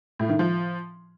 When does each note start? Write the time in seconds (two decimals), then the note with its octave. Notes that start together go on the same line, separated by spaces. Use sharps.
0.19 A2
0.29 D#3
0.39 F3